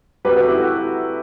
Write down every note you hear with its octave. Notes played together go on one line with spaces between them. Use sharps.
C3 F#3 G4 B4
F#4 A4
E4 G4
F#4